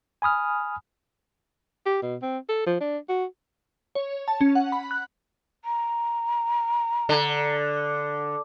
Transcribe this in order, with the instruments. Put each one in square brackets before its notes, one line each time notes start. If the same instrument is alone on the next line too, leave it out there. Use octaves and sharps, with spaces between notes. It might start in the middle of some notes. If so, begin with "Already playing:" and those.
[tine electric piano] G#5 B5 D#6 F6
[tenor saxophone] G4
B2
C4
A4
F3
D4
F#4
[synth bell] C#5
A5
C#4
F#5
B5
F#6
[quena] A#5
[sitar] D3